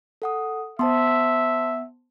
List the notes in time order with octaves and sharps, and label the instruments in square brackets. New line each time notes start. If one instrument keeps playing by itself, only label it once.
[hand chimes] A4 F#5 D#6
[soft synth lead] B3 [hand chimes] C5 A5 C6 [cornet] E5